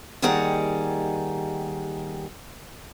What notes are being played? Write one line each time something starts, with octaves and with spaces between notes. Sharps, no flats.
D#2 D#3 G3 G#4 F#5 A#5